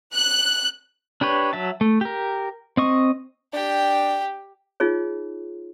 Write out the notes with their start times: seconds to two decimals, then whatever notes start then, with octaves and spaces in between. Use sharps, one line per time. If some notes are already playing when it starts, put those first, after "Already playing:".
0.14 F#6
1.21 D4 G4 B4 C#5
1.53 F#3 E5 A5
1.81 A3
2.01 G4 A#4
2.77 C4 D#5 C#6
3.53 D4 G4 G5
4.80 D#4 F4 G#4 C#5